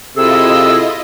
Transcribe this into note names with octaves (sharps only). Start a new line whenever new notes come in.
C3 E4 F4 G#4 A4 D#5 E6